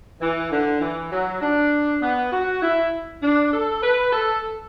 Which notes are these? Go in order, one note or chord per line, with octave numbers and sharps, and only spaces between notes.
E3
D3
E3
F#3
D4
B3
F#4
E4
D4
A4
B4
A4